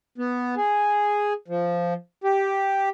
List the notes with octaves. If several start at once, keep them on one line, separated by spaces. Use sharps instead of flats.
B3
G#4
F3
G4